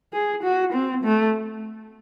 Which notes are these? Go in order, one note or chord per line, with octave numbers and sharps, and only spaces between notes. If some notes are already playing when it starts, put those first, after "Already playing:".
G#4
F#4
C4
A3